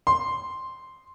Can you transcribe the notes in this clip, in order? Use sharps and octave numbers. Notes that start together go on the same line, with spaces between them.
C6